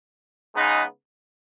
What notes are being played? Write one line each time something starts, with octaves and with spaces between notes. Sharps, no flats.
C#3 G#3 B3 D#4